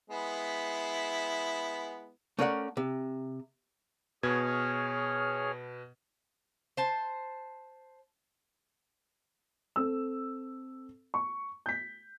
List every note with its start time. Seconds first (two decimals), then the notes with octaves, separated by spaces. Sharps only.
0.10 G#3 B3 E4
2.39 A3 C#4 A#4 D5 E5 F#5
2.77 C3
4.23 B2 G#4 B4 C#5 F6 G#6
6.77 C5 A5
9.76 C4 A4 E6
11.14 C#6
11.66 G6 B6